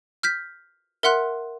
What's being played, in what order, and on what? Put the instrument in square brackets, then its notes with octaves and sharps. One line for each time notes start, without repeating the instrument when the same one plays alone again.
[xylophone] F6 G6 B6
A#4 E5 F#5 C6 F#6